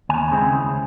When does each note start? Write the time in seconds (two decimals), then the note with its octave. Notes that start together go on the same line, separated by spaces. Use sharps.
0.09 D#2 G#5
0.31 C#3 G#3 C4 E4
0.55 C#2